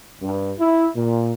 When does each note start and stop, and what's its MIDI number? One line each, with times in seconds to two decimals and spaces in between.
0.22 0.52 43
0.59 0.87 64
0.95 1.33 46